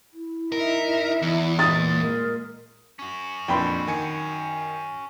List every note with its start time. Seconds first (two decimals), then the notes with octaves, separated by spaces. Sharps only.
0.14 E4
0.52 D#4 A#4 E5
1.22 E2
1.59 A#2 G#3 D#5 D#6 A6
2.01 A#4
2.99 C#4 F#4
3.48 F2 A#2 D4 G5 B5 C6
3.87 D#3 G#5 C#7